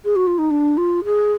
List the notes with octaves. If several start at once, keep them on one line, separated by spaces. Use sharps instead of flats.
G#4
F#4
F4
D#4
D4
F4
G#4